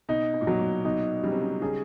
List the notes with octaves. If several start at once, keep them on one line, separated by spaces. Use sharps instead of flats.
B2 D#4
B2
A#2
B2 F#3
A#2
B2 D#4
C#3 G3
C3
C#3
C#3 G#4